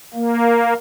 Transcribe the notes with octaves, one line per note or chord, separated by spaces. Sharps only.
A#3